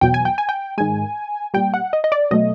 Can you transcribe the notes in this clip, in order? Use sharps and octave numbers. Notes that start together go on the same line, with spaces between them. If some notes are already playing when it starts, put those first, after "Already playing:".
E2 B2 F#3 G5
G#5
G5
G#5
G5
G#2 D#3 G#3 G#5
A#2 G3 G5
F#5
D#5
D#5
D5
B2 F#3 A3 D#5